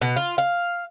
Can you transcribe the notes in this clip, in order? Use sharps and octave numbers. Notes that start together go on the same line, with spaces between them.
B2
F4
F5